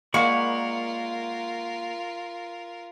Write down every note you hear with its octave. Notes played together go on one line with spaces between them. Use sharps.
G#3 A#3 F4 A#4 D5 F#5 B5 C#6